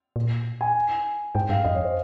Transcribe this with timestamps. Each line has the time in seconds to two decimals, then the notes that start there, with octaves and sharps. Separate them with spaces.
0.16 A#2
0.61 G#5
1.35 G#2 G5
1.49 G2 F5
1.64 F2 D#5
1.75 C#5
1.85 C5